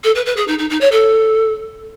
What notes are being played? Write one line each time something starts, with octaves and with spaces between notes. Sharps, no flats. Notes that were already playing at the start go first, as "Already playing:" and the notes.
A4
B4
B4
G#4
D#4
D#4
D#4
C#5
A4